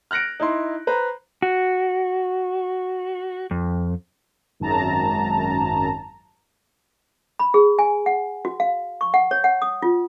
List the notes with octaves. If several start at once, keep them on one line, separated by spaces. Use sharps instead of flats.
F6 F#6 A#6 C#7 D7
D#4 E4 C6
B4 C5 A#5
F#4
F2
G#1 F#2 A5 A#5
B5
G#4
G#5
F#5
F#4
F5
C#6
F#5
C#5
F#5
D#6
F4